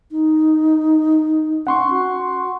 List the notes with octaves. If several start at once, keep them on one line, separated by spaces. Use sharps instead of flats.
D#4
C#4 F#5 C6 C#6
F#4